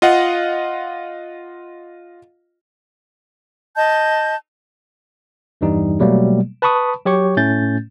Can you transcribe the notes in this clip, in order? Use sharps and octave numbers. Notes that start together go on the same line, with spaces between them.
F4 D#5 F5 F#5
D#5 A5 G6
E2 G2 E3 G3 D#4
B2 F#3 G3 A3 A#3
B4 A5 B5 C#6 D#6
F#3 G4 C#5 C#6
A2 A3 C#4 G6 A6